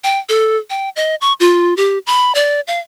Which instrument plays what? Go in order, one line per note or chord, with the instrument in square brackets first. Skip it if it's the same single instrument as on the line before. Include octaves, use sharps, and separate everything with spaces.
[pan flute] G5
A4
G5
D#5
C#6
F4
G4
B5
D5
F5